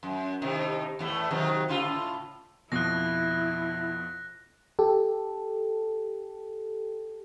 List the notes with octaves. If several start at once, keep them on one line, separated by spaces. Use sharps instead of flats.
F#2
A2 C3 D#3
E2 A2 A3
C3 D#3 F#3
A2 C#3 F4
F2 B2 F3 E4 F#6 A#6
G4 A4